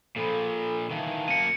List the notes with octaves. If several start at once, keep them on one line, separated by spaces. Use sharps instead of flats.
A#2 F3 A4 B5
D#3 E3 F5 A5
F#2 A#3 C#7 D#7